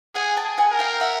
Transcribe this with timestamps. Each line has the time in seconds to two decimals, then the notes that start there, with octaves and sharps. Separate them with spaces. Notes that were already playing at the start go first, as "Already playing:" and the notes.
0.15 G#4 F#5 G#5
0.37 G5 A5
0.44 G#4
0.58 F#5 G#5
0.72 A#4
0.79 F5 G5
1.00 E5 F#5